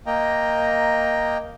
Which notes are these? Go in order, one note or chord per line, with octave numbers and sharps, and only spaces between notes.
A#3 D#5 G5 A#5